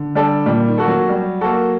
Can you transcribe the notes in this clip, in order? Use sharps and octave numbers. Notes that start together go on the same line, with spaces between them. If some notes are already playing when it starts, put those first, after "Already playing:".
Already playing: D3
G3 D4 A4
A#2 G3
D#3
A#3 F#4 A4
F#3
G3
A#3 F#4 A4